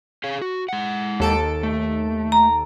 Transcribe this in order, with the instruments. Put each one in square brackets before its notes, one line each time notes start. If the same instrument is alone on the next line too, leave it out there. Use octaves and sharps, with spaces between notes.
[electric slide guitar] G#4 C#5 F5
F#4
G#3 F#5
[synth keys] D#2 A4 D7
[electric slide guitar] A3
[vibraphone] A#5